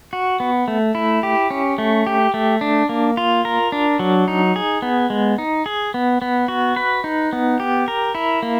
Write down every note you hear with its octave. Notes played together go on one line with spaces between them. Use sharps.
F#4
B3
A3
E4
G4
C#4
A3
G4
A3
D4
A#3
F4
A#4
D4
F#3
D#4
G#4
B3
G#3
D#4
G#4
B3
B3
F#4
B4
D#4
B3
G4
A#4
E4
A#3